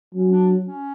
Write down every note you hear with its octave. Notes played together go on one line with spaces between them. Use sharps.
F#3 C#4
D4
C#4